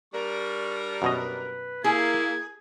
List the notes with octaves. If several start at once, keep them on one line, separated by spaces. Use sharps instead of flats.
G3 D4 A#4 C#6
F#2 B2 B4 D#5
A#3 E4 G#4 G#6